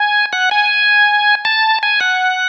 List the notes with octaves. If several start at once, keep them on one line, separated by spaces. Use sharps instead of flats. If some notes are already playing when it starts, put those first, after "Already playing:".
Already playing: G#5
F#5
G#5
A5
G#5
F#5